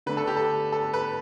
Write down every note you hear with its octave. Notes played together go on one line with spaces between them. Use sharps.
D3 A3 D4 B4
A4
G4
A4
A4
B4